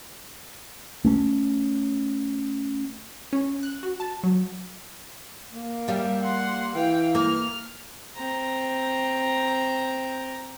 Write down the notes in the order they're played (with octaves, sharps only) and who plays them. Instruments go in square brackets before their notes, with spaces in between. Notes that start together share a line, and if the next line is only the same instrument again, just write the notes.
[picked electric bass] A3 C#4
[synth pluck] C#4
F#6
F#4
A5
F#3
[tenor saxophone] A#3
[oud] G3 F5 [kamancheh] G4 E5
[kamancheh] F#5 C6
[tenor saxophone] E3 [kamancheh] F5 G5
[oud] A#3 [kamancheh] F6
[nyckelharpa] C4 A#5